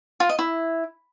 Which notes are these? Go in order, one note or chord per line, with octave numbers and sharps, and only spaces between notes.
F4
D#5
E4